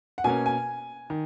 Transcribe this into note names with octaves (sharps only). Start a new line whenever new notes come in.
F#5
B2 A#3 C#4 G#5
G#5
D#3